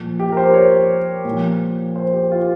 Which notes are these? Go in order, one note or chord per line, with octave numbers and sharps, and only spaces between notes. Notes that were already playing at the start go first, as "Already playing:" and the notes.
Already playing: A#2 F3
G4
A#4
C5
C#5
A#2 F3
C5
G4
F4